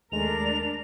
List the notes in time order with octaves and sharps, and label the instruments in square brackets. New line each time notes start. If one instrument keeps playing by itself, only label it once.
[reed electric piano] D#2 G#3 A3 [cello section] D4 A#4 [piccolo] F7